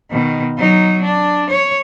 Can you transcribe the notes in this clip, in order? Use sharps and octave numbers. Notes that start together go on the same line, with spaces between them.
B2 D#3
F#3 D#4
D4
C#5